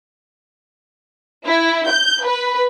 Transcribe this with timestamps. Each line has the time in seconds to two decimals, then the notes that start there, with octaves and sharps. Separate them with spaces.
1.44 E4
1.88 G6
2.24 B4